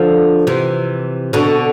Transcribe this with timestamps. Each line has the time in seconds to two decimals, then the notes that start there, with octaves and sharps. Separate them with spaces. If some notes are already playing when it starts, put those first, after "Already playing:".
Already playing: D3 F3
0.47 C3 E3
1.33 B2 D3